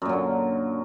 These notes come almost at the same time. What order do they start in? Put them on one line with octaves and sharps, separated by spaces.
F#2 A#2 F#3 D3